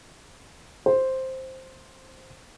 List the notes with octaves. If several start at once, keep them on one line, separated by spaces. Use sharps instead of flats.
C5